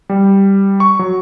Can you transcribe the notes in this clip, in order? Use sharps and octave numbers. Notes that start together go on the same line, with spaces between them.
G3
C#6
F#3